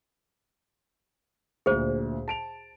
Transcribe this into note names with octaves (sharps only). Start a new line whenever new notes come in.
D2 A#2 G#4 C5
A5 D7 F7